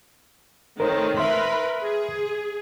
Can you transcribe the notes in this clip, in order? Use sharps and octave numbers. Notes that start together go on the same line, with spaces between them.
D#3 A3 C4 A#4 C5 C#5
A#4 B4 E5 B5 C6
G#4